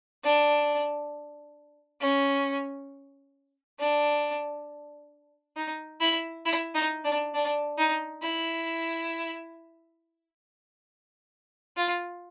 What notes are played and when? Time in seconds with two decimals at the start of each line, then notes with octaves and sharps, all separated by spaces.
0.24 D4
2.01 C#4
3.80 D4
5.56 D#4
6.01 E4
6.46 E4
6.75 D#4
7.05 D4
7.34 D4
7.78 D#4
8.23 E4
11.77 F4